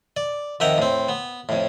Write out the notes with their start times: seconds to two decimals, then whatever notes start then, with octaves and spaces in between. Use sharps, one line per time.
0.17 D5
0.60 F2 D#3 E5 F#5 G5 A#5
0.78 A2 C4
1.09 B3
1.49 F2 A2